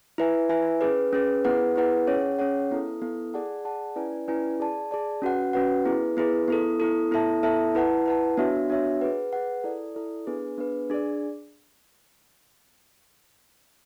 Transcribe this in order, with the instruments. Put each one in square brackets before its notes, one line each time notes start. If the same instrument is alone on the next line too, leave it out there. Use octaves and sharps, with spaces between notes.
[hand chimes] E4 B4 E5 G#5
E4 B4 E5 G#5
C#4 G#4 B4
C#4 G#4 B4
B3 E4 G#4 B4 F#5
B3 E4 G#4 B4 F#5
C#4 G#4 C#5 F#5
C#4 G#4 C#5 F#5
B3 E4 A4
B3 E4 A4
G#4 D5 F#5 A5
G#4 D5 F#5 A5
C#4 E4 B4 D5 G#5
C#4 E4 B4 D5 G#5
G#4 D5 A5
G#4 D5 A5
C#4 F#4 B4 F#5
C#4 F#4 B4 F#5
B3 E4 G#4 B4
B3 E4 G#4 B4
B3 E4 A4
B3 E4 A4
B3 E4 A4 E5 A5
B3 E4 A4 E5 A5
E4 B4 F#5 A5
E4 B4 F#5 A5
B3 D4 F#4 C#5 E5
B3 D4 F#4 C#5 E5
G#4 B4 F#5
G#4 B4 F#5
E4 A4 D5
E4 A4 D5
B3 D4 G#4 B4
B3 D4 G#4 B4
D4 G#4 D5